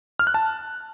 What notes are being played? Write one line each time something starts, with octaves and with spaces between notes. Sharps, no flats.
F6
F#6
A5